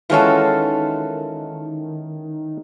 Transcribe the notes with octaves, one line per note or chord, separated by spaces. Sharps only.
D#3 E3 G#3 C#4 F4 F#4 A4